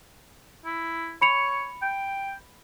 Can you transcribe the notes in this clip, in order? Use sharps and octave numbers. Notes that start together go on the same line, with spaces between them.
E4
C#5 B5 C#7 F7
G5